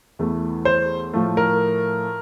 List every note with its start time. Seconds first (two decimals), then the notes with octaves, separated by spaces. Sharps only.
0.19 E2 E3 A3
0.65 C5
1.14 A2 F3 A3
1.37 A#4